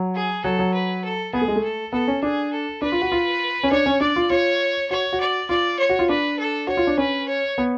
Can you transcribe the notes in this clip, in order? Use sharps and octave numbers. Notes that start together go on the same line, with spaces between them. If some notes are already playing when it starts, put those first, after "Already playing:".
Already playing: F#3
G#4
F#3 A4
F#3
B4
A4
B3 G#4
A3
G#3
A3
A4
B3 A4
C#4
D4 G#4
A4
D4 B4
F4
F#4
F4
C#4
D4 C#5
C#4
D4 D5
F4
F4 C#5
F#4 C#5
F#4
D5
F4 D5
C#5
F#4
F4
D4 B4
A4
F#4 C#5
F4
D4
C#4 B4
C#5
B3